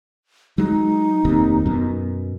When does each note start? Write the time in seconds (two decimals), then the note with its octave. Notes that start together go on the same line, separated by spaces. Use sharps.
0.58 F#3 G#3 D#4
1.25 F1 D#2 C3
1.66 F#2 B2